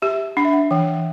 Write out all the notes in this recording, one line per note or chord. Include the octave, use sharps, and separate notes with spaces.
G4 E5
D4 F#5
E5
F#5
E3 G5